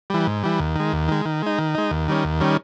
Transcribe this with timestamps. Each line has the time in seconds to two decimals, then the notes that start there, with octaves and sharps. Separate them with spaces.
0.10 E3 G3
0.27 G#2
0.43 E3 G3
0.60 D#2
0.76 D#3 G#3
0.93 D#2
1.09 D#3 G#3
1.25 D#3
1.42 G#3 D#4
1.59 D#3
1.75 G#3 D#4
1.91 D#2
2.08 D#3 G3 C#4
2.25 D#2
2.41 D#3 G3 C#4